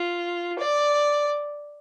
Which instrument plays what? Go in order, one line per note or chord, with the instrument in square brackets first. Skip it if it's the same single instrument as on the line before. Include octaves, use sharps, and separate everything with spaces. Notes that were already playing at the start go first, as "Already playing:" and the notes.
Already playing: [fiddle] F4
D5